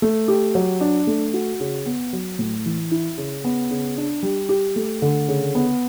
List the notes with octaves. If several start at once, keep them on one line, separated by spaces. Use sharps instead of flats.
A3
G4
F#3
D4
A3
F#4
C#3
B3
F#3
A2
E3
E4
C#3
B3
C#3
D4
G3
G4
A3
D3
C#3
B3